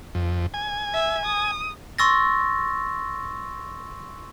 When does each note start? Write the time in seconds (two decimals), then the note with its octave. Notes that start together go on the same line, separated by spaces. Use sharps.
0.15 F2
0.54 G#5
0.94 E5
1.25 D#6
1.98 C6 C#6 E6 A6 A#6